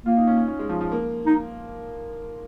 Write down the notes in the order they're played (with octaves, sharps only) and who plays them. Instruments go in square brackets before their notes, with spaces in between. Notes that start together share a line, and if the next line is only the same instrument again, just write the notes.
[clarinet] A#3 [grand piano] F4
[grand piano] D#4
C#4
C#4
C#4
G#3
F3
F3
A#3
[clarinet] D#4